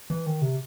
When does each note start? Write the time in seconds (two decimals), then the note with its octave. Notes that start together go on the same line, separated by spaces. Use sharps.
0.10 E3
0.26 D#3
0.42 C3